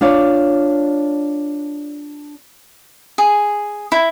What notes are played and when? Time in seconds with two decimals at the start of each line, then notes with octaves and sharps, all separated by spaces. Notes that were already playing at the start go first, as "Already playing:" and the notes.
0.01 D4 F4 C#5 D5
3.18 G#4
3.92 E4